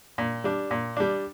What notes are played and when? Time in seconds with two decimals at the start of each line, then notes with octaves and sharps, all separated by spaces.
0.18 A#2
0.44 G3 D4
0.71 A#2
0.97 G3 D4